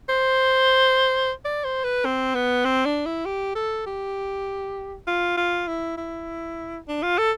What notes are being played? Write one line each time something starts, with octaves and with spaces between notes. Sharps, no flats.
C5
D5
C5
B4
C4
B3
C4
D4
E4
G4
A4
G4
F4
F4
E4
E4
D4
F4
A4